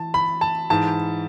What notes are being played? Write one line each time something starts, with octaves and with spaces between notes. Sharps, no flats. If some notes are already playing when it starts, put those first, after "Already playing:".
Already playing: E3 A5
B5
A5
G#2 E3 A5